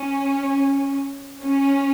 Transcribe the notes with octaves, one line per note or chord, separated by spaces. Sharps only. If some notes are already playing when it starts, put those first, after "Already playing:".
Already playing: C#4
C#4